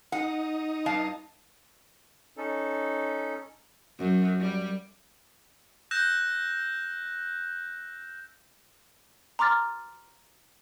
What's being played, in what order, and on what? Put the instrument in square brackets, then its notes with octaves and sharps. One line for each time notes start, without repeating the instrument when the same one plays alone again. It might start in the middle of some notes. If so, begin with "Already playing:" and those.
[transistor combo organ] D#4 [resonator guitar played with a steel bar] F#5
[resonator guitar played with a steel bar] G2 F5 A5
[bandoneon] C#4 D#4 A4
[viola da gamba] F#2
G3
[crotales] E6 F#6 G6 A#6 E7
[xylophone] A#5 C6 D6 F6 A6